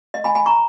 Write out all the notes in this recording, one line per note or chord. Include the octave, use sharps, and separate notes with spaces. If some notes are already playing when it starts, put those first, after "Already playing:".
D#5
G#5 B5
G#5 B5
A#5 C#6